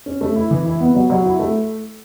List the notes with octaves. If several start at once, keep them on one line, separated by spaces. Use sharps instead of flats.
C#4
A3
E4
E3
E4
B3
F#3
F#3
E4
A3